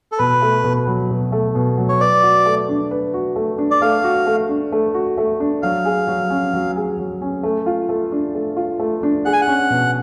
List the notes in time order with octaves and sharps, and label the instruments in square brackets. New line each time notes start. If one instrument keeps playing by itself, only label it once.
[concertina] A4
[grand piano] B2 [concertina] B4
[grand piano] A3
B2
F#3
B2
A3
B2
F#3
[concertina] C#5
[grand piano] B4 [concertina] D5
[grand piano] F#4
A3
D4
B4
F#4
A3
D4
[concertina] D5
[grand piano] A3 [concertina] F5
[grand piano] F#4
A3
D4
A3
F#4
A3
D4
[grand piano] F#3 [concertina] F5
[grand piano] G#4
F#3
C#4
F#3
G#4
F#3
C#4
A3
F4
A3
D4
A3
F4
A3
D4
[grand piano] G#4 [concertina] F#5
[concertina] G#5
F#5
[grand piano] C#4
B2